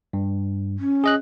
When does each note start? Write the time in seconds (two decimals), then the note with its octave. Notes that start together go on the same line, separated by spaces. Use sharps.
0.13 G2
0.79 C#4
1.04 G#4 D#5 F#6